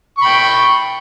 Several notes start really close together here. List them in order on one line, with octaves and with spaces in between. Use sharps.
C#6 B5 G5